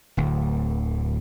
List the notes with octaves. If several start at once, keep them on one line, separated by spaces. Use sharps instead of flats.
D1 D2